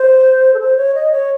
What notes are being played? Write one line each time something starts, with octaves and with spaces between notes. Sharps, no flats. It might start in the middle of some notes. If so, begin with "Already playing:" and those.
Already playing: C5
A4
C5
C#5
D#5
C#5